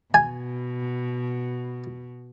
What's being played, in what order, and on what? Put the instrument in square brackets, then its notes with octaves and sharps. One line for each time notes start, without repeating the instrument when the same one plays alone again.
[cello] B2 [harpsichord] G#5